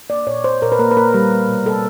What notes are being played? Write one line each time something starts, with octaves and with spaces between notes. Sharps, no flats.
A#3 D5
A#2 C#5
A#2 C5
A#2 A#4
B4
A#3 A#4
B4
A#3 A#4
G3
G3
B2
C3 A4